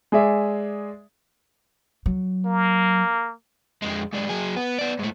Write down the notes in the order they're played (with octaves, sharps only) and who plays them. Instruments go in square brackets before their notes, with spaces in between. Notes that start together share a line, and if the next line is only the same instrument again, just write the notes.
[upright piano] G#3 G#4 D5 E5
[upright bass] F#3
[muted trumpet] A#3
[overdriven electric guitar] F2 G#3
G#2 D4
F#3 G#4
B3
B3 D5
G#2 A3